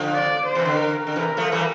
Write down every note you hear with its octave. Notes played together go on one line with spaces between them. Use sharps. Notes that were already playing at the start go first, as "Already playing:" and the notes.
Already playing: D3 F3
D5
C5
C3 E3
D3
A#4
D3 A#4
C3 E3
F3 A3
E3 G3